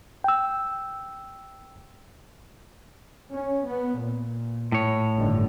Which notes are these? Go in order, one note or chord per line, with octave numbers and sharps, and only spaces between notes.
G5 E6
C#4
B3
A#2
A2 C#5
G1 D3 D#3